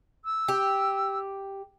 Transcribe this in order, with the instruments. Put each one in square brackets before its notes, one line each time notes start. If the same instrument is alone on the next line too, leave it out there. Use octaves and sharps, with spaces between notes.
[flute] E6
[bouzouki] G4